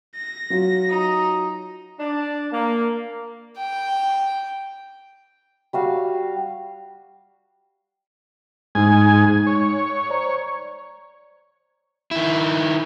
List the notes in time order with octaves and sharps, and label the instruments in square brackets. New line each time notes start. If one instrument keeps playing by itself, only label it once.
[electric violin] A#6
[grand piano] F#3 F4
[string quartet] D#4
[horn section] D4
A#3
[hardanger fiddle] G5
[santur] G3 F#4 F5
[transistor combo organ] G#2 G#5 [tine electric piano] G#3 D#4
[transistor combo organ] C#5
[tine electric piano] C5 D5 A#5
[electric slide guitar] D#3 E4